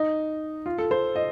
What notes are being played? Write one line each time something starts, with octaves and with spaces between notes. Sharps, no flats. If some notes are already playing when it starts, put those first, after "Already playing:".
Already playing: D#4
F4
A4
C5
D#5